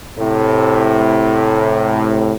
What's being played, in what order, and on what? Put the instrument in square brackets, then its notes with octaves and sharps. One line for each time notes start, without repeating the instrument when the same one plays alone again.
[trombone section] A2 C3